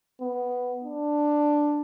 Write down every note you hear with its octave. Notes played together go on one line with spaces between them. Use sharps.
B3
D4